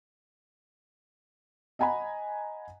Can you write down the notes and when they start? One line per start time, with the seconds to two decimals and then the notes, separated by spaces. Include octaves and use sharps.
1.79 D#5 F#5 G#5 A#5 B5